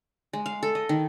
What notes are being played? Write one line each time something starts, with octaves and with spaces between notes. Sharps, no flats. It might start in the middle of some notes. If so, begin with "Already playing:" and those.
G#3
F5
A4
D#5
D#3